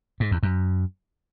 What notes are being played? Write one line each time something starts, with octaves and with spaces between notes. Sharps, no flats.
G#2
E2
F#2